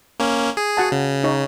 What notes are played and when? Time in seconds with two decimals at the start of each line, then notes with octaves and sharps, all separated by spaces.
0.20 A#3 C#4
0.57 G#4
0.77 F#4 F#5 A5
0.92 C#3
1.24 D#4 C#5